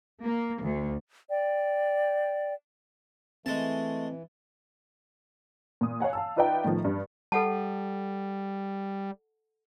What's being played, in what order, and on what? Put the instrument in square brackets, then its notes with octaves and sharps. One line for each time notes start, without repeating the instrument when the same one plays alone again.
[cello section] A#3
D2
[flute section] D5 G5
[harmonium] E3 [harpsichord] G#3 A5 [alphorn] A3 [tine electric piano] C4
[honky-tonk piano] A#2 D#6
C#5 F5 F#5 G#5
F5 A5 E6
D#4 F4 B4 D5 E5 G5
A2 D#3 F3
G2
[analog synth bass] G3 [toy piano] A4 F#5 A5